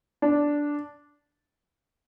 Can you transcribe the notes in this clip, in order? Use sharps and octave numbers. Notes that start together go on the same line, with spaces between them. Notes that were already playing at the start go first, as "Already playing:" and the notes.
D4